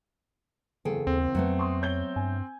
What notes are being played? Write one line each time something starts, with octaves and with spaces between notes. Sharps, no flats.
F#1 E2 G#4 A4 G5
D#2 C4
F2 F#3 A3 B3
C6 C#6 D#6
C#5 G6 G7
G2 G#5